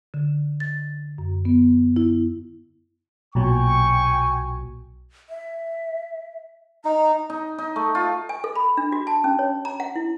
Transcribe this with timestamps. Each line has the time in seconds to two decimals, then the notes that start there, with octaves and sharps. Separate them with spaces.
0.14 D3
0.60 A6
1.18 F#2
1.45 B3
1.96 E4
3.35 B1 A#2 F#3 G5 G#5 C#6
5.29 E5
6.85 D#4 A#5
7.30 D#4
7.58 D#4
7.76 A3
7.95 F4
8.29 G#5
8.44 A4
8.55 B5
8.77 D4
8.92 F#4
9.07 A5
9.24 C#4
9.39 C#5
9.65 A#5
9.80 F#5
9.96 E4